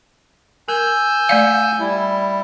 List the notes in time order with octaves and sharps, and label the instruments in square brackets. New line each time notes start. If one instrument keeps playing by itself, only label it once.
[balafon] A#4 [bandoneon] G#5 E6 G6
[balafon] A3 D5 F5
[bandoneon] G3 E4